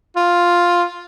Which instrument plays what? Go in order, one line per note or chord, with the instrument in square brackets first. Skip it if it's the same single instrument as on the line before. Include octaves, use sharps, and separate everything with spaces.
[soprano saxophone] F4